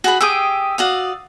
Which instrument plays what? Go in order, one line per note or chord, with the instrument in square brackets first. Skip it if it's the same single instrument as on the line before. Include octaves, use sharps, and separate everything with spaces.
[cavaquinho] F#4 G#4 B5
[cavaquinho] G4 G#4 G5 [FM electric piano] D#6 E6
[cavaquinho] F#4 D5 F5